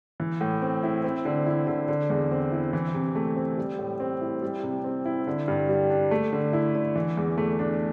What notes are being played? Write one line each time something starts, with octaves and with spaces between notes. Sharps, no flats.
E3
A2
C4
E4
C4
D3
E4
D3
D3
E2
C4
E4
E3
C3
A3
C4
G3
A2
C4
E4
G3
C3
C4
E4
D3
G2
G3
D4
A3
D3
E4
D3
E3
E2
A3
D4